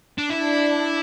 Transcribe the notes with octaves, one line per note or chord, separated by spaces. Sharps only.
D4
D4 E4